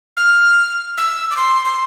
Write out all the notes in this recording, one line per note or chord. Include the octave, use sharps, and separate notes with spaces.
F6
E6
D6
C6
C6